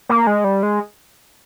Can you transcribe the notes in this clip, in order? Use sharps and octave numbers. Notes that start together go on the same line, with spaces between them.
A#3
G#3
G3
G#3